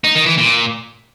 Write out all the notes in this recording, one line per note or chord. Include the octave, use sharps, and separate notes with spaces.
D#4
D#3
E3
A#2